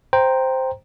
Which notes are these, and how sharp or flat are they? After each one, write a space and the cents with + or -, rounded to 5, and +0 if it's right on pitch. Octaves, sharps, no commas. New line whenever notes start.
C5 +0 G5 +0 A#5 +0